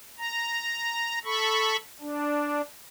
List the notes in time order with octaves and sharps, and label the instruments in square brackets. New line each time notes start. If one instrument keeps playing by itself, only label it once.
[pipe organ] A#5
A4 B5 C#6
D4